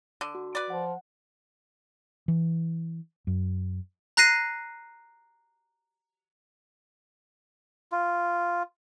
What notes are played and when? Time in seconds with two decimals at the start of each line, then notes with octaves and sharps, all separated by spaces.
0.21 D3
0.35 F#4
0.55 B4 D5
0.70 F3 F#5
2.28 E3
3.27 F#2
4.17 A#5 F#6 A#6 C7 D#7
7.92 F4